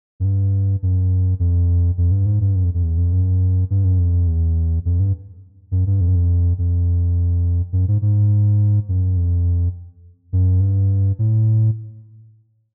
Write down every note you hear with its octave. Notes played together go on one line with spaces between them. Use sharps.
F#2
G2
F#2
F2
F2
G2
G#2
G2
F#2
F2
F2
E2
F2
F#2
G2
F#2
F2
E2
F2
G2
F#2
G2
F2
F#2
F2
F2
F#2
G#2
G#2
F#2
F2
F#2
G2
A2